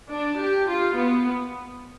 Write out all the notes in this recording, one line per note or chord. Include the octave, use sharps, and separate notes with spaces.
D4
G4
F4
B3